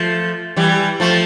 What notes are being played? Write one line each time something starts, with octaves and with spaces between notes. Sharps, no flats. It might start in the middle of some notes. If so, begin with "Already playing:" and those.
Already playing: F3 A3
E3 G3
F3 A3